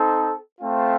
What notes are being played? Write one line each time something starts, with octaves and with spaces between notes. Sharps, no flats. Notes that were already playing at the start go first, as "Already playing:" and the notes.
Already playing: C4 D#4 A4
A3 C4 F4